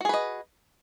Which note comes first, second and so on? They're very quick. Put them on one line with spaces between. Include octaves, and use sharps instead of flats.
F#4 G#4 B4 D#5